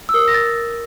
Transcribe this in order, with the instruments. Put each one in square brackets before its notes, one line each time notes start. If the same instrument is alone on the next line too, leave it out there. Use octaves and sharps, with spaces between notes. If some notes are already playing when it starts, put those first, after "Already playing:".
[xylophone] E6
A#4 D#6
A#6
A6